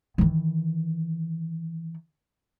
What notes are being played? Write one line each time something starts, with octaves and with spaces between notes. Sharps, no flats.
D#3 E3